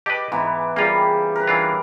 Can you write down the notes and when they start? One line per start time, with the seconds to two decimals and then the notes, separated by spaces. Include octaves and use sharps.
0.06 G4 B4 D#5 A5 D6
0.32 G#2 E3 B3
0.76 C#3 G3 A#3 F4 G4
1.35 A#4 B4
1.47 E3 D4 F4